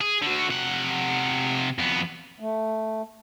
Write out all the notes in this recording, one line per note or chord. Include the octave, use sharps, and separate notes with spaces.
G#4
D3 F#4
C3 F#5
F2 B3
A3